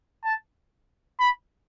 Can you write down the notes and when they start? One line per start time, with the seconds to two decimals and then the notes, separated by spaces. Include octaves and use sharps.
0.24 A5
1.20 B5